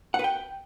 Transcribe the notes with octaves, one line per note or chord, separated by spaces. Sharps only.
F#5
B4
G5